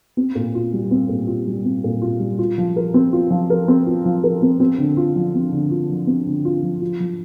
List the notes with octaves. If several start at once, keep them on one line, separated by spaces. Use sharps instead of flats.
C4
A#2
F4
G3
C4
A#2
F4
G3
C4
A#2
F4
G3
F4
F3
A#4
C4
F4
F3
A#4
C4
F4
F3
A#4
C4
C4
D3
F4
F3
C4
D3
F4
F3
C4
D3
F4
F3
F4
F3